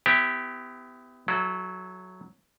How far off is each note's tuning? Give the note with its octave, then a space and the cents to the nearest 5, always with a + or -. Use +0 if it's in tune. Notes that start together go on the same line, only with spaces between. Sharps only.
B3 +30 E4 +0 G4 +0
F#3 +0 E4 +0 A4 -30